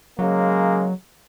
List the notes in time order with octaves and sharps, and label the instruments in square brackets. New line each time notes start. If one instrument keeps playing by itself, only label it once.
[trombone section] C#3 G#3 A#3 [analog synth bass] F#3